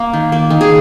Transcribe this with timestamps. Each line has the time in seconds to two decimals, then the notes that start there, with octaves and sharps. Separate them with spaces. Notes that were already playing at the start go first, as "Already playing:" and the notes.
Already playing: A#3
0.13 D#3
0.32 A#3
0.50 D#3
0.61 G#4